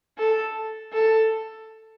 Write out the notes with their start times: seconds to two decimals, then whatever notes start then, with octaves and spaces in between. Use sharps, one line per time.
0.18 A4
0.93 A4